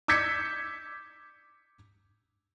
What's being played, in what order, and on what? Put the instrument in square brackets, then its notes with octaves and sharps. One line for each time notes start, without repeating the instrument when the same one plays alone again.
[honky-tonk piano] D6 E6 G6 G#6 B6 C#7